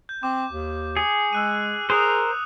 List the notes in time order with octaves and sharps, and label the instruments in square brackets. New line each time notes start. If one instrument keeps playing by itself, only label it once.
[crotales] G6
[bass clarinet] C4 [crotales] D6
[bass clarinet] D#2
[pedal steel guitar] G#4 [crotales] C#7
[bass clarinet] G#3 [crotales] E6 F#6 D#7
[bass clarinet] G#4 [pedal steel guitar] A#4 C5 [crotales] D#6 F#6 F7